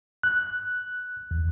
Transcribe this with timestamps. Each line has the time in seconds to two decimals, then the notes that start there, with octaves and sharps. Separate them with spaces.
0.23 F#6
1.31 E2